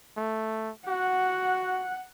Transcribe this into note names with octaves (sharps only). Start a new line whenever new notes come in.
A3
F#4 F#5